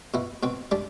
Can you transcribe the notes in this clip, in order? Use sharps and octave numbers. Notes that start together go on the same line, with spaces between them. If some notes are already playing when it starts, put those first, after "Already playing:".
B2 E4
B2 C4
G3 D4